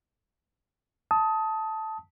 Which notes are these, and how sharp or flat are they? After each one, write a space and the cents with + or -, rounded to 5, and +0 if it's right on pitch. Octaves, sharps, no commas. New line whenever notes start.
A5 +0 D#6 +20